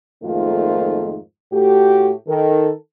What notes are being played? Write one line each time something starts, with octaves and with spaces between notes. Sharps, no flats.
F2 G#2 D#3 A3 A#3 F4
A2 A3 F#4 G4
D#3 A4